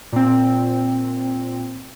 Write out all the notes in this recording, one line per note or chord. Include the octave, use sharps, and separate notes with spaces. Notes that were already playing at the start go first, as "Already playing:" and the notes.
A#2 C4